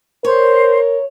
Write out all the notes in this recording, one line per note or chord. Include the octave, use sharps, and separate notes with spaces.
A#4 C5 C#5